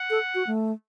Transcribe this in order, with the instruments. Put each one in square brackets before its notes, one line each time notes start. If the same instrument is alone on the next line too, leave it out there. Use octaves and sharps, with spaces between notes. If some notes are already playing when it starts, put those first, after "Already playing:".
Already playing: [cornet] F#5
[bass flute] A4
F#4
A3